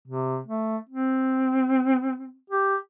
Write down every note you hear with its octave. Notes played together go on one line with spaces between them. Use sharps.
C3
A3
C4
G4